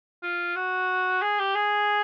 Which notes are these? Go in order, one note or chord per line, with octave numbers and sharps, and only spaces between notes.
F4
F#4
G#4
G4
G#4